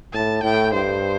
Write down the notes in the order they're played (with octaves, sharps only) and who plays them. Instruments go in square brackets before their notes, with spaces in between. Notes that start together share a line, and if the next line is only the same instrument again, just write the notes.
[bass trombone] A2 [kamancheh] A5
[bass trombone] A2 [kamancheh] G5
[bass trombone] G2 [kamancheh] C5